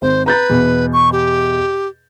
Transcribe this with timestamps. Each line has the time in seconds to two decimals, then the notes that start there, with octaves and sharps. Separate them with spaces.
0.02 G#1 C5
0.26 B4 A#5 G6 A6
0.50 E2 B2
0.93 C#6
1.12 G4